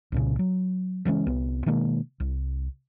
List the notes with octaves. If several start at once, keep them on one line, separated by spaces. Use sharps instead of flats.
C2 A#2 C#3
F#3
C#3 E3 G#3 C#4
C2 B3
B2 D#3 G#3 A#3
C2